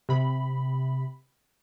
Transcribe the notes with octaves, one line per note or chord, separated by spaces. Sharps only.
C3 B5